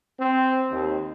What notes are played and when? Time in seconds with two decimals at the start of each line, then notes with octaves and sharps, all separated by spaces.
0.20 C4
0.71 D#2